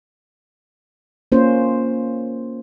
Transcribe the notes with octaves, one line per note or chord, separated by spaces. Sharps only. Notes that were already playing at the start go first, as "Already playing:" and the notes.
A#3 C#4 F4 C5